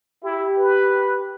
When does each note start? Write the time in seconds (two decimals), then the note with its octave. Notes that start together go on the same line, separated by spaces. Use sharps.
0.24 E4 G4
0.58 B4